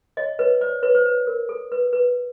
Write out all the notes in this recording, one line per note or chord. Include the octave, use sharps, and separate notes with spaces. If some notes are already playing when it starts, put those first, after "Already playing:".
C#5 D#5
B4 C#5
C5 D5
B4 C#5
C5
B4
A#4
A4
B4
B4